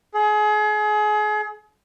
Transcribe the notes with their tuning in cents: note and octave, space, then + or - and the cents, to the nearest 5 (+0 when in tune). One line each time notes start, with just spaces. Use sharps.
G#4 +30